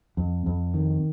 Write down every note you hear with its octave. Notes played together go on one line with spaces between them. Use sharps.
F2
F2
D#3